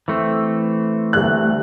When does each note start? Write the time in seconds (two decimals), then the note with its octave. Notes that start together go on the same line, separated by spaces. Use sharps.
0.08 E3 A3 C4
1.13 D2 G3 F#6